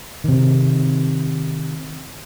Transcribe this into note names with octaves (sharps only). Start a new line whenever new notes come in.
C3 D#3